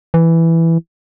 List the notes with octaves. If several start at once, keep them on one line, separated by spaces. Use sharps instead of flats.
E3